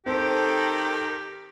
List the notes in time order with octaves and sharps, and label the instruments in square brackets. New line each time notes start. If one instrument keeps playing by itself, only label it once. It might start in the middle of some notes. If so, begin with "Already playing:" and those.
[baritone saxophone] D#3 [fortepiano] C4 [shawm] G4 [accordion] A4 G5